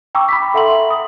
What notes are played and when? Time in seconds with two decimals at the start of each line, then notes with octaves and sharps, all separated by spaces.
0.15 G5 A#5 C#6 D6 E6
0.29 B5 B6
0.54 A4 E5 F#5 A#5 C6 F#7
0.90 D#6